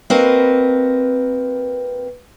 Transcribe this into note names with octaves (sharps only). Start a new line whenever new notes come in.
A#3 C4 F#4 A#4 B4 D#5